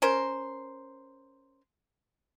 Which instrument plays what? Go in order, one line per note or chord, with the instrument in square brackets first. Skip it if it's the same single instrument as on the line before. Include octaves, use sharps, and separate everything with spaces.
[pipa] C#4 A#4 C5